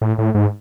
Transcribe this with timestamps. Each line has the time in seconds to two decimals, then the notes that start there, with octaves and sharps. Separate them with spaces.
0.01 A2
0.18 A2
0.35 G#2